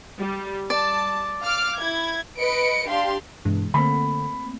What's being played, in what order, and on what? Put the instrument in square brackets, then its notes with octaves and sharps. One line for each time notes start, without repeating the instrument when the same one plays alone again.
[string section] G3
[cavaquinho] D5 [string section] A5
[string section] F5 D6 F6
E4 G#6
[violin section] B4 D#5 C#7 D7
D4 G4 F5 C6
[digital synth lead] G2 [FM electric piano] B2 E3 G#3
[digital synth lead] D3 [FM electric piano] A3 A#3 C4 [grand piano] B5